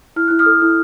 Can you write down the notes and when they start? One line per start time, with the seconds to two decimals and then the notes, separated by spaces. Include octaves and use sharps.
0.16 E4 F6
0.28 E4 F#6
0.39 D#6 F6
0.46 A4
0.62 E4